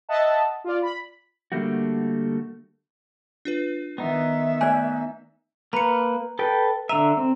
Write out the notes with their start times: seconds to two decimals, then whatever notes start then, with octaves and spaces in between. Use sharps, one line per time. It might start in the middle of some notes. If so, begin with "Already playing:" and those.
0.09 D#5 E5 F#5 A5
0.64 F4 D5
0.82 B5
1.52 D3 G3 A3 A#3 F#4
3.45 D4 F4 B4
3.98 D#3 B3 D#4 E5
4.61 A3 D5 G#5 F#6
5.73 A#3 B4 A#5 C#7
6.39 A4 B4 G5
6.89 D3 E5 A#5 D#7
7.17 C4